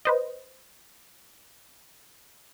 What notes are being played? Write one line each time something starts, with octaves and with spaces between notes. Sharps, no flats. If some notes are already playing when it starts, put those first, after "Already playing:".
B4 C5 D#5